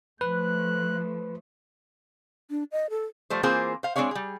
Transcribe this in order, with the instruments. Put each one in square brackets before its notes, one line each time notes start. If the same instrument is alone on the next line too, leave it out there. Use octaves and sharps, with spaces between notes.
[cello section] F3 A3 [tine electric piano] B4 [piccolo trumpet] F#6
[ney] D4
D#5
A4
[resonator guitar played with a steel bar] F3 G3 A3 C5
E3 A#3 C4 F4 G#4 C5
C5 F5
G#3 C4 D4 G#4 C#5 F5
G3 G#4